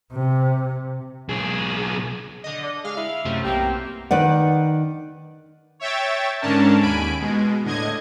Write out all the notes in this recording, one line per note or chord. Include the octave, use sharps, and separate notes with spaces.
C3
B1 G#4
D3 D#5
D5
G#3 F5
E4
F#2 C3 A3
B1 A#3 C4 G4
D#3 B4 D5 F#5
C#5 E5 G5 A6
G#2 D3 C#4 D4 A#4 A5
D#2 G#5 B5 D7
B2 G#3
A2 D3 D#5 G#6